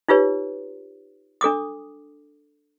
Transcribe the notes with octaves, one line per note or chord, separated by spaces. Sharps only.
D#4 F4 G4 B4 C#5
D4 A4 D6 D#6